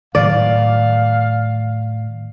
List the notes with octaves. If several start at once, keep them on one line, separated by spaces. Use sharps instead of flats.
A2 D#3 F#3 D5 F5